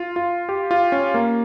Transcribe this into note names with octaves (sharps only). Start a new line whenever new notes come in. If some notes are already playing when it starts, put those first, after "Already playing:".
Already playing: F4
F4
G4
F4
C#4
A#3